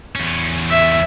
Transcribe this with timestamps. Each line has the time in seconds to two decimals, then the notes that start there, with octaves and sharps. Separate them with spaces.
0.15 E2 C#4
0.70 E5